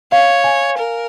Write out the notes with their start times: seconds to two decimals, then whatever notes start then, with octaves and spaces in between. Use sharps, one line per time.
0.12 C#5 F5
0.44 G#5
0.77 A#4